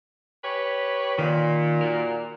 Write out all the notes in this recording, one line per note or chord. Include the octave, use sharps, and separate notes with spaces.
G4 B4 C#5
A#2 D#3
F#4 A#4